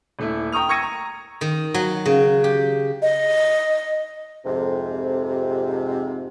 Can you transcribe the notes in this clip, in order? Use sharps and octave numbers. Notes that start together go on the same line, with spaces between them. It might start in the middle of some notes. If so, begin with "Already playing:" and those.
D#1 A3 E4
G5 A#5 C#6 D#6 F7
C#6 E6 G#6 A#6 C#7 D#7
A#5
D#3
F#3
C#3
G4
D#5
F2 G#2 C3